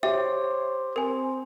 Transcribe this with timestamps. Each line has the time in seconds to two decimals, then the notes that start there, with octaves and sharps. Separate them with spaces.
0.03 G4 C5 C#5 E5
0.96 C4 A#4 G#5